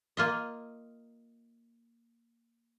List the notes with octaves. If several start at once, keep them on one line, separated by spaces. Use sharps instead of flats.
A#3 F4 D#5